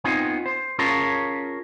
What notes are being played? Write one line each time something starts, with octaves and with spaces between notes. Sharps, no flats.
B3 C4 D#4 F4 G#5
C5
C#4 F4 G#4 A#4 C#5 A5